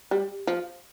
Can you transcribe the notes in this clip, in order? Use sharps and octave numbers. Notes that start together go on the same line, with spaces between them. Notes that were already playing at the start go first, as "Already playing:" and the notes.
G3
F3